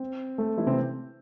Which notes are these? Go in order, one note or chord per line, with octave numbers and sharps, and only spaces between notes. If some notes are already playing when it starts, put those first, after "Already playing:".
Already playing: C4
A3 A4
E3 E4
C3 C4